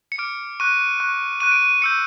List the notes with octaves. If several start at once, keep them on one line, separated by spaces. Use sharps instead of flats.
C#7
D6 F6 D7
C#6 F#6 D#7
C#6 F#6
C#6 F#6 D#7
D7
D#7
C#6 E6 G6 C#7